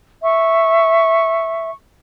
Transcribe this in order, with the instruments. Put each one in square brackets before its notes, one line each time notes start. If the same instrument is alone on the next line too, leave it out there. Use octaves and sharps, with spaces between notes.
[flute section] E5 C#6